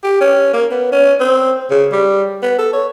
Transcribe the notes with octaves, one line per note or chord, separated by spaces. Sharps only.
G4
C#4
A#3
B3
C#4
C4
C#3
G3
B3
A4
C#5